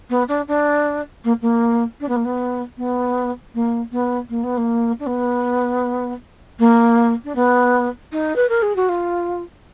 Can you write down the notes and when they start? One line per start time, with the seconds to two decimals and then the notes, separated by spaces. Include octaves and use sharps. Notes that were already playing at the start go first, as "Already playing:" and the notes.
0.10 B3
0.28 D4
0.48 D4
1.24 A#3
1.42 A#3
2.00 D4
2.08 B3
2.16 A#3
2.25 B3
2.78 B3
3.54 A#3
3.92 B3
4.30 A#3
4.43 B3
4.57 A#3
4.99 D4
5.06 B3
6.59 A#3
7.25 D4
7.35 B3
8.12 D#4
8.36 B4
8.49 A#4
8.62 G#4
8.76 F#4
8.89 F4